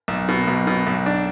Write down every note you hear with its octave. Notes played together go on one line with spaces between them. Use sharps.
B1
B2
B1
B2
B1
D4